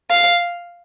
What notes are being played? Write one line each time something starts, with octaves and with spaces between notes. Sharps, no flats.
F5